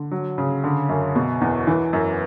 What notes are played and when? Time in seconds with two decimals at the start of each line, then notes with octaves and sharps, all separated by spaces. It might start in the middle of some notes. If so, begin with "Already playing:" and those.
Already playing: D3
0.11 F#3
0.38 C#3
0.64 D3
0.89 F#2
1.15 B2
1.41 E2
1.67 E3
1.93 F#2